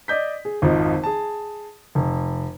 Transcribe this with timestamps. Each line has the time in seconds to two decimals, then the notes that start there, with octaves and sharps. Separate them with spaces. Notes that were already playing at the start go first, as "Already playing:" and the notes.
0.08 D5 D#5 G6 B6
0.45 G#4
0.62 G#1 F2 F3 D#4
1.04 G#4 A5
1.95 F1